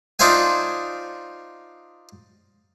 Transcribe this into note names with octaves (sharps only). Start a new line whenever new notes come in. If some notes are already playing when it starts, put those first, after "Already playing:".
D4 D#4 F4 C5 E5 G#5